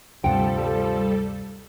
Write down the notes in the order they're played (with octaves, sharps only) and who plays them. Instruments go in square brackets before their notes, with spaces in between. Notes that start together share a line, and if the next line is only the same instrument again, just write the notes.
[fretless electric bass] D2 G2 C3 [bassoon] F3 [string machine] G3 A4 [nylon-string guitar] F#5 G5